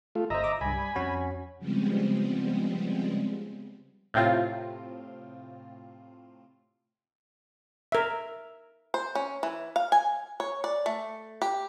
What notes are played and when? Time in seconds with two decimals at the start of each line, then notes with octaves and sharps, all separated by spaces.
0.15 A3 F4
0.30 G1 C5 D#5 E5 A#5
0.44 D6
0.61 C2 G2 G#5 B5
0.74 G3
0.96 F2 C#4 F#4
1.58 C#3 F3 G3 G#3 B3 C4
4.14 A2 C3 C4 F4
7.92 A#4 E5
8.94 C5
9.15 C#4
9.43 E3
9.76 F5
9.92 G#5
10.40 C#5
10.64 D5
10.86 A3
11.42 G4